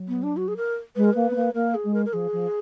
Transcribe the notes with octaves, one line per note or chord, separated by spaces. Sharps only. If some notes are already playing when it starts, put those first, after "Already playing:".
Already playing: F#3
B3
D4
F#4
G#4
A#4
G#3 B4
A#4
A#3 B4
B3
A#3
A#3 A#4
G#4
G#3
A#4
A#4
F3 G#4
F3